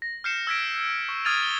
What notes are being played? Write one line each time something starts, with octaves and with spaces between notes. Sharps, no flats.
A#6
F6 G6 C7 C#7 E7
E6 F6 G#6 A#6 B6 D7
C#6
D#6 F6 G#6 A6 D#7 F7
G7